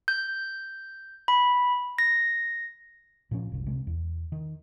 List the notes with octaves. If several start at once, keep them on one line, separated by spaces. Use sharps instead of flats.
G6
B5
A#6
A#2 F3 C#4
F#1 C2
C3 G#3
E2
D#3